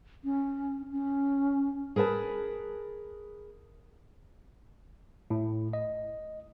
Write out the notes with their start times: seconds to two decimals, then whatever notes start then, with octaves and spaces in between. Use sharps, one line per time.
0.24 C#4
0.92 C#4
1.96 G#4 A#4 B4 F5 A5
5.30 A2
5.73 D#5